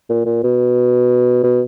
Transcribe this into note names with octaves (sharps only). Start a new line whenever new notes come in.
A#2
A#2
B2
B2